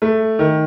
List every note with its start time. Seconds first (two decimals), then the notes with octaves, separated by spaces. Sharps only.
0.02 A3
0.39 D#3